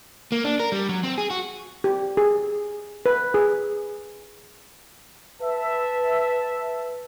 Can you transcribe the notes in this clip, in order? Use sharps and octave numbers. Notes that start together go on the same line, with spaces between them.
A#3
D4
A#4
G3
F#3
C4
G#4
F#4
G4
G#4
B4
G#4
B4 E5 A5